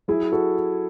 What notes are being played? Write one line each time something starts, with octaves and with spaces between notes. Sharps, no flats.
F#3 E4 G#4
F#4 A4